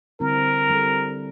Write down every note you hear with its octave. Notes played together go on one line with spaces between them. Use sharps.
D3 G3 C4 E4 A#4
G3 C4 E4 A4